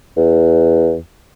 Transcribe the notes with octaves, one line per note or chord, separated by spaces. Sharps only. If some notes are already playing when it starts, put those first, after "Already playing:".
E2